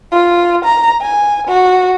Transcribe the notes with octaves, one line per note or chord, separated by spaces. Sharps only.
F4
A#5
G#5
F#4